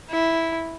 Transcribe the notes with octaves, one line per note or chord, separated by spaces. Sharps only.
E4